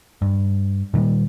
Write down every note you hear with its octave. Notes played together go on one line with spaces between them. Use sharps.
G2
A#2 D#3 F3 G3